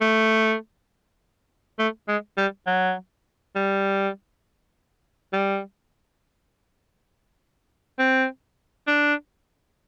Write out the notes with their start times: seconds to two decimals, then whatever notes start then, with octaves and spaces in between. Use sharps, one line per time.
0.01 A3
1.79 A3
2.08 G#3
2.38 G3
2.67 F#3
3.56 G3
5.33 G3
7.99 C4
8.87 D4